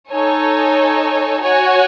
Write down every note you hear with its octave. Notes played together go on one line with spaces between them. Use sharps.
D#4 A4 C#5 G#5
F#4 C#5 G#5